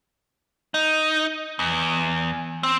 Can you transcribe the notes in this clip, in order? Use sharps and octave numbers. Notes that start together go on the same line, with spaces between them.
D#4
E2
C4